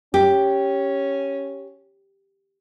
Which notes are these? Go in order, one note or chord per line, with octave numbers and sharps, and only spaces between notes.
C#4 G4